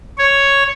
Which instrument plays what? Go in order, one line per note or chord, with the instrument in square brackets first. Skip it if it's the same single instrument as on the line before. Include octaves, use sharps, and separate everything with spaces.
[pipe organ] C#5